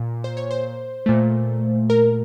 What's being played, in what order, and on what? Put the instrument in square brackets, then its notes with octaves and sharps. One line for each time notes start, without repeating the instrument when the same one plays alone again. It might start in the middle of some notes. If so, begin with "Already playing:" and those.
Already playing: [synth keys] A#2
C5
C#5
C5
A#2 A3
A#4